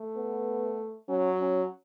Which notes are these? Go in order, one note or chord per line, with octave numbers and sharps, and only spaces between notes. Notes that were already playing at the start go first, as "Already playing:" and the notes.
Already playing: A3
B3
F#3 C#4
C#4